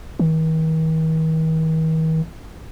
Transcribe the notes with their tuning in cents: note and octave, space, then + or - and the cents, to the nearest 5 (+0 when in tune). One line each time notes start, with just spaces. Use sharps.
D#3 +45